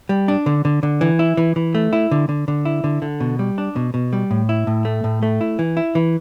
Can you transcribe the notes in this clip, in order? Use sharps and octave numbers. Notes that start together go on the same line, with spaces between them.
G3
D4
D3
D3
D3
E3
E4
E3
E3
A3
E4
D3
D3
D3
E4
D3
D3
B2
G3
D4
B2
B2
G3
A2
E4
A2
A3
A2
A3
E4
E3
E4
E3